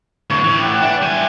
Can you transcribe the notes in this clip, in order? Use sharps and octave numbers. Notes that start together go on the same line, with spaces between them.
A2 D3 C#5
A2 E3
G4 F#5
E3 D4
G3 G#5